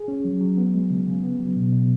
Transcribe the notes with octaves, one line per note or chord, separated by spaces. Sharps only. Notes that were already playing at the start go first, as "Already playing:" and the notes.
Already playing: G#4
C#4
F#3
F#3
B3
G#3
C#3
C#3
B3
F#3
B2
B2